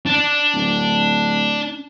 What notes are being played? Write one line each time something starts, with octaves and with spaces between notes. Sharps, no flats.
D4
D1